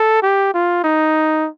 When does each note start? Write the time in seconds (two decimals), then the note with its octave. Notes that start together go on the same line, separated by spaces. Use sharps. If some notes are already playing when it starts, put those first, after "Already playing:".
Already playing: A4
0.23 G4
0.54 F4
0.84 D#4